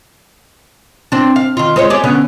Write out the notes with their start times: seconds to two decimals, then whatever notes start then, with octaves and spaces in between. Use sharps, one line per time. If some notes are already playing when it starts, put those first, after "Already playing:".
1.12 C4 D4
1.36 F5
1.57 D#3 F4
1.76 G#3 C5 C#5
1.90 G4 G#4 D5
2.04 D3 B3 C#4